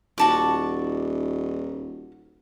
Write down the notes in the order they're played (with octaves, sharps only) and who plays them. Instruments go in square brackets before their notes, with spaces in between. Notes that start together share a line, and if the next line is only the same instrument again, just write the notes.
[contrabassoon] D#1 [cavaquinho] F#4 A5 D6